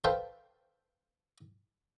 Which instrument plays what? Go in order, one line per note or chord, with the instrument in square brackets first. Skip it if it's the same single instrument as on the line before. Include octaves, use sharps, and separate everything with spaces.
[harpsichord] A4 B4 C5 F5 G5